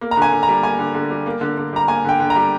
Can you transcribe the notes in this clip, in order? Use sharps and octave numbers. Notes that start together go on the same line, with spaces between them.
A#3
A#5
D3 G#5
D3
A#5
G3
A#3 G#5
D3
D3
G3
A#3
D3
D3
G3 A#5
A#3 G#5
D3 G5
D3
A#5
G3